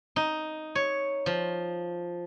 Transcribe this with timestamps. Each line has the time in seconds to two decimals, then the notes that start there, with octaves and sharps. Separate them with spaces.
0.16 D#4
0.75 C#5
1.26 F3